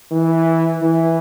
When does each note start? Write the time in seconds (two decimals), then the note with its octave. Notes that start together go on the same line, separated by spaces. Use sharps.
0.11 E3
0.82 E3